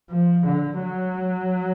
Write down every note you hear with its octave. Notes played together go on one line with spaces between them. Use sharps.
F3
D3
F#3